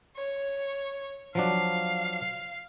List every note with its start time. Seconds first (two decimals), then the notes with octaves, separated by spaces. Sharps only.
0.16 C#5
1.35 F3 F#3 D4 F5